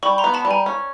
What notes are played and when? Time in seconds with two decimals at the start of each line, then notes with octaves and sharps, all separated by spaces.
0.03 G3 B5 C#6
0.18 A#5 C6
0.24 B3
0.34 A5 B5
0.45 G3
0.51 G#5 A#5
0.66 C#4